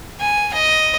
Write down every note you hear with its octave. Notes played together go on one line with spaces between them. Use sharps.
G#5
D#5